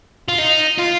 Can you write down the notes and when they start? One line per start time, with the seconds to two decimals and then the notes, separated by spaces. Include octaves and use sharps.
0.28 F4
0.38 D#4
0.78 F4